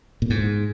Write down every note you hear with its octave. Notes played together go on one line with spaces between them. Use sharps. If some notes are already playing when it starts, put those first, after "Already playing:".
A#2
G#2